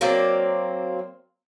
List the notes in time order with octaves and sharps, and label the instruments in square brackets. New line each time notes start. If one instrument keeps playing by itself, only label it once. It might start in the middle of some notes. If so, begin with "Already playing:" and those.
[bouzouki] F#3 A#3 C4 D5